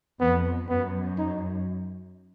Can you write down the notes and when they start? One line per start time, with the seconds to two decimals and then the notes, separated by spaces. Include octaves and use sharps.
0.20 F2 B3
0.69 F#2 B3
1.18 D#4